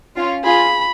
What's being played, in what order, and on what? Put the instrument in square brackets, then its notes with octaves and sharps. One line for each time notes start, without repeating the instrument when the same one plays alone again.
[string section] C#4 F4
[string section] F4 G#4 [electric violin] B5